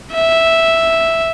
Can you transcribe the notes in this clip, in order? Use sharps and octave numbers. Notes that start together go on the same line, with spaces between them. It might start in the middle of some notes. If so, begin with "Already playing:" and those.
E5